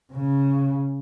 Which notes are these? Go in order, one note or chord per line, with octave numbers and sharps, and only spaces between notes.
C#3